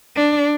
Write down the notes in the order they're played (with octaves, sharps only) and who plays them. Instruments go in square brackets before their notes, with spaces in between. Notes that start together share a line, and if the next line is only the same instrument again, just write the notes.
[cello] D4